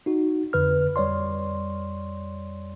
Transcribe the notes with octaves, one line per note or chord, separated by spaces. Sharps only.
D#4 F#4
F2 D3 B4 F6
F2 G3 C#5 D5 C6